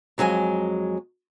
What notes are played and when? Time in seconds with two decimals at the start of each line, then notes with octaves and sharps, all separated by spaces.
0.18 F2 F#3 G#3 A4 G#5